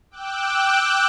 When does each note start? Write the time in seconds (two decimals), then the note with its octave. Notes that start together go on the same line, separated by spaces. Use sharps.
0.11 G5 D6 E6 F#6